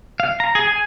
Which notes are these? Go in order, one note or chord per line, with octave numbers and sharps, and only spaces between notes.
F5
A#5
G#4
G#5